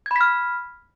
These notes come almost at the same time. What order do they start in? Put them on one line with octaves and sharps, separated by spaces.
G#6 B5 B6 F6